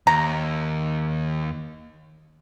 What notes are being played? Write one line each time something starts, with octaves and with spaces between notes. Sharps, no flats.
D#2 A#5